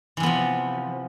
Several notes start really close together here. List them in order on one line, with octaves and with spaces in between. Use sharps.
E3 C3 B3 F3